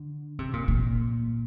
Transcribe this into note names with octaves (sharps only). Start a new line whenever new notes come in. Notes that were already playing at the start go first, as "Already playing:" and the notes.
Already playing: D3
C3
A#2
A#2